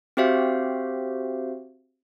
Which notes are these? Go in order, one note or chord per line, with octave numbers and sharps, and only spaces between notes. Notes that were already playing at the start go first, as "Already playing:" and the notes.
C4 F#4 G4 C5 E5 F5